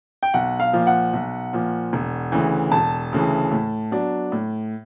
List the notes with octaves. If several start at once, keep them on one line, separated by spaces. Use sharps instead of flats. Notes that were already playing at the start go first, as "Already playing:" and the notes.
G5
B1 F#5
F5
A#2 F3
F#5
B1
A#2 F3
E1
D2 C#3 E3
E1 A5
D2 C#3 E3
A2
F#3 B3 D4
A2